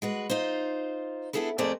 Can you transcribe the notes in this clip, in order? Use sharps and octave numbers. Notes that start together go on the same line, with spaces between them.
G#3 F#4 B4
D#4 F4 C5
B3 D4 E4 G#4 A4 B4
F2 A3 C4 G#4 A#4 D5